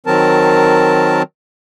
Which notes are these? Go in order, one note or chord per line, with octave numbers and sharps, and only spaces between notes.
D#3 F#3 C4 A#4 A5